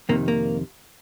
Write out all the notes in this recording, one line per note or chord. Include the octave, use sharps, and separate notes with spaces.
F2 C3 D#3 A#3
A#3